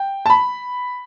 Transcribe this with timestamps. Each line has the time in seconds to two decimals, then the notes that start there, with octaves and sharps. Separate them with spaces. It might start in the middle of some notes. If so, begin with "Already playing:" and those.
Already playing: G5
0.26 A5
0.30 B5